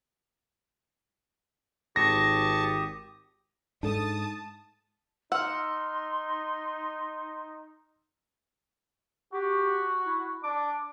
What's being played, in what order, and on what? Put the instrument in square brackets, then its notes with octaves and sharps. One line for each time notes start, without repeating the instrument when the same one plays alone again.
[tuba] G#1 [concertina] G4 D#6 [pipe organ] A5 C#6 [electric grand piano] A#6
[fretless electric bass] G#2 [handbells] D4 A4 [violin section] A5 D#6
[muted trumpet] D#4 [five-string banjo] F#5 [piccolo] C6 [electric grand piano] E6 F6
[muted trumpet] F#4 [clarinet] G4
[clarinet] E4
[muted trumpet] D4 [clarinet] D6